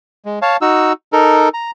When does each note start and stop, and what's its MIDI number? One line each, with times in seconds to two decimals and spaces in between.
0.25 0.39 56
0.42 0.57 73
0.42 0.57 77
0.42 0.57 81
0.61 0.93 63
0.61 0.93 66
0.61 0.93 88
1.13 1.49 63
1.13 1.49 69
1.13 1.49 70
1.54 1.71 82